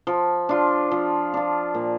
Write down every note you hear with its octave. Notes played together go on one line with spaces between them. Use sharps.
F3
D4 F4
F3
D4 F4
A#2